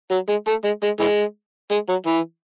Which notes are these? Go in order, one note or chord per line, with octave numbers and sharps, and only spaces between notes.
F#3
G#3
A3
G#3
G#3
E3 G#3
G#3
F#3
E3